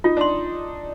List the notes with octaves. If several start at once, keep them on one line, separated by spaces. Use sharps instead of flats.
D#4 F4
D4 C6